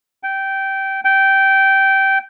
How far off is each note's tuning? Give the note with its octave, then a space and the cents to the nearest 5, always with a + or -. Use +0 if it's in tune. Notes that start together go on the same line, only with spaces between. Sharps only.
G5 -15
G5 -15